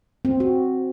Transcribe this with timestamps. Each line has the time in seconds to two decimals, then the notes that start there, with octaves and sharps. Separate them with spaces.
0.25 C4
0.40 F#4